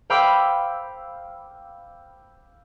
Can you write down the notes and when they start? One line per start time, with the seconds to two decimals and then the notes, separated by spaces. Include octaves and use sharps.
0.10 C5 F5 G5 B5 D6 E6